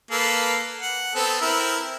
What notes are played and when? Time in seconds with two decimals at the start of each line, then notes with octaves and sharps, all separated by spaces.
0.11 A#3 A4 B4
0.81 F#5
1.15 B3 C4 A4
1.41 C4 E4 A#4